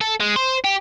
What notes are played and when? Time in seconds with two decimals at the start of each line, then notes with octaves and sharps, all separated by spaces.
0.01 A4
0.20 G#3
0.36 C5
0.64 G4